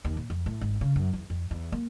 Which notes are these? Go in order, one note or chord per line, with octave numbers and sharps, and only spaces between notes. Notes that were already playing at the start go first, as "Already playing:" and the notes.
D#2
A#2
F2
A2
G#1
C#3
F#2
E2
F2
E2
A#3